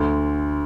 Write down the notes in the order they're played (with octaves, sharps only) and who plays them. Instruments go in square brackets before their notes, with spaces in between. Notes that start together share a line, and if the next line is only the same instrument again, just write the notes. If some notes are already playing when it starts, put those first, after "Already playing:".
Already playing: [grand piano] D2 D3